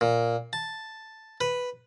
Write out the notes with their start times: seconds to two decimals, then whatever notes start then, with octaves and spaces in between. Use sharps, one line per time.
0.01 A#2
0.53 A5
1.41 B4